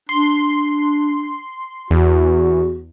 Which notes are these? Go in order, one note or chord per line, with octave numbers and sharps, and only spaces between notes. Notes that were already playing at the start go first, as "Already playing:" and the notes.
D4 C6
E2 F#4